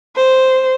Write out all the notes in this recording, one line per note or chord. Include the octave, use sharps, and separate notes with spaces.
C5